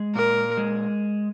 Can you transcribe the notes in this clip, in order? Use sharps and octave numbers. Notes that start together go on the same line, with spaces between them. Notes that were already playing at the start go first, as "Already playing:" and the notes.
Already playing: G#3
A#2 A#4
G#3